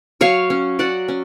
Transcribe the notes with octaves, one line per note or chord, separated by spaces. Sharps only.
F#3 C#5 F5
C#4
F#3 D5 F#5
C#4